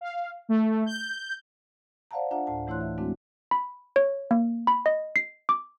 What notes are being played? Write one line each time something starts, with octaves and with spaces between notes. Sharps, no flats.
F5
A3
G6
C5 D5 F5 F#5 A5 A#5
D4 F4 E5 F#5 A5 A#5
D2 A2 A5
E3 A3 E4 C#5 C6 F#6
E5
G#3 A3 C4 D4 E4 F#4
B5
C#5
A#3
B5
D#5
C7
D6